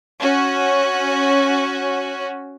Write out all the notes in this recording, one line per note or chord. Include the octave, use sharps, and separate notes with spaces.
C#4 F#4